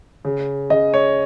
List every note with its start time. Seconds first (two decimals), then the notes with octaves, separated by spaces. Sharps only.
0.25 C#3
0.70 C#3 D#5
0.94 C#5